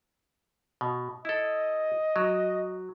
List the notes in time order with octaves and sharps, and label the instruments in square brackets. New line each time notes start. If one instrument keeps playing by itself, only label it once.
[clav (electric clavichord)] B2
[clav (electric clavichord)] E4 A4 [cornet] D#5
[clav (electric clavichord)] F#3